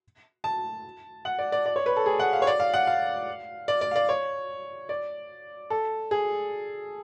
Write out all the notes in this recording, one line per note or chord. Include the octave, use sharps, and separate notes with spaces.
A5
F#5
D5
D5
D5
C#5
B4
A4
G#4
F#5
F5
C#5
D5
F5
F#5
F5
D5
D5
F5
D5
C#5
D5
A4
G#4